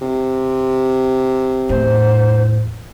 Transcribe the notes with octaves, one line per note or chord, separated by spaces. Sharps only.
C3
E2 A2 C5